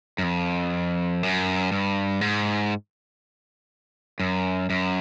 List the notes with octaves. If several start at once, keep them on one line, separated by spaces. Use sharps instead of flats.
F#2
F2
F#2
G2
G#2
F#2
F#2